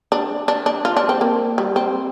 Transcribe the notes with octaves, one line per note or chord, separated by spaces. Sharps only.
D4
D4
D4
F4
D4
C4
A#3
G3
C4